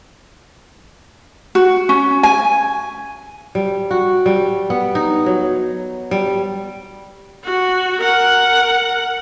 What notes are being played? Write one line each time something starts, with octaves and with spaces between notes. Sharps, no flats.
F#4
C#4
G#5
G3
F#4
G3
B3
D#4
F#3
G3
F#4
A#4 F#5